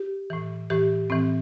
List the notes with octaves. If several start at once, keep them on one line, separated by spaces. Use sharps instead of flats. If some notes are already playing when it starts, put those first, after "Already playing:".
Already playing: G4
A2 E3
A2 E3 G4
A2 E3 C4